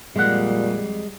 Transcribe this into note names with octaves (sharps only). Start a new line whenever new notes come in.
F2 A#2 G3 G#3 F#5